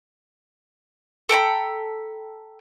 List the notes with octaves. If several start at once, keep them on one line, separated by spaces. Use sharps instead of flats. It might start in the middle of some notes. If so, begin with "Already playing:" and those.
A4 G5 A#5 B5